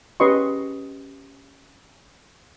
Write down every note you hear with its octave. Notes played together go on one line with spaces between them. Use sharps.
C#4 G4 B4 D#5 C6 C#6